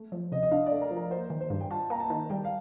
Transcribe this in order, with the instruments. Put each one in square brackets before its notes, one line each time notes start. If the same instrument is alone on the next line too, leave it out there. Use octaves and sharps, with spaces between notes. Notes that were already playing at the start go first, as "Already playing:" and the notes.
Already playing: [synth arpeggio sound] A3
F3
[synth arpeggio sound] C3 [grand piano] D#5
[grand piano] D#5
[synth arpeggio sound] D4 [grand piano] F5
[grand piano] D5
[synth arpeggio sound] A3
[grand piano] A#4
[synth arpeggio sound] F3
[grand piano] A#4
[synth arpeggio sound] A#3 [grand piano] C5
[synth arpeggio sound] D#3
[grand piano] C5
[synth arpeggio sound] G2
[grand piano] G5
[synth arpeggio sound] F4 [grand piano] A5
[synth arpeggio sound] A#3 [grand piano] A#5
[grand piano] A5
[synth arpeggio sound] D#3
[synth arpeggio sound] G3 [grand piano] G5
[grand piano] F5